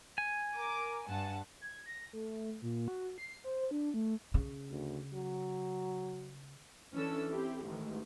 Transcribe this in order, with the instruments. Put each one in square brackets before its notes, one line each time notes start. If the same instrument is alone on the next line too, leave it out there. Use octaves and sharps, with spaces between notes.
[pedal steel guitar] G#5
[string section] A#4 D6
G2 F#5 A5
[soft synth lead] G#6
A#6
A3
A#2
F#4
C7
C5
D4
A3
[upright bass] C#3
[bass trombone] D2
F#3
[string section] E3 C#4 D4 A4 E6
C4 E4 G4 A4
A1 G#2 D#3 E3